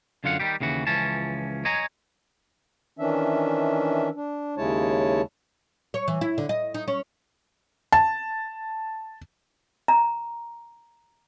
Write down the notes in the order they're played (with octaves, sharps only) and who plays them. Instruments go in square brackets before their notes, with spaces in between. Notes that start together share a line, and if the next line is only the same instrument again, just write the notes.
[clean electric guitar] F#2 D3 F4 F5 F#5
D#3 G3 G4
D#2 C#3 E3 F#4
C#2 E3 F3 C#4 A5
C#5 D#5 G#5 A#5
[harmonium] D#3 E3 C#4 D4 E5
D4
D#2 C#3 G#3 E4 C#5 A5
[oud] C#5
E3
E4
D3
D#5
D#4
C#4
[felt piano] A5
[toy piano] A#5